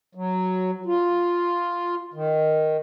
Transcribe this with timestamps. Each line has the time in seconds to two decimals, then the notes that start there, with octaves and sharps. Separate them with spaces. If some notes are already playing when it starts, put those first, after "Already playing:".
0.15 F#3
0.86 F4
2.14 D#3